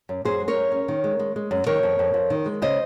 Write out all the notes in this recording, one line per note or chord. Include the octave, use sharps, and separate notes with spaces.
F#2
F#2 G#4 C5
G#3
A#4 C#5
F#2
C#4
D#3
G#3
G#3
G#3
F#2
D#3 A#4 C#5
F2
F2
F2
D#3
G#3
C#3 C5 D#5